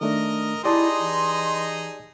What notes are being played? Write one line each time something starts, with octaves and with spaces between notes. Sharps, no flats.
D#3 A3 D4 A#4 D#5
D#4 E4 G4 G#4 D5 D#5 A5 C6
E3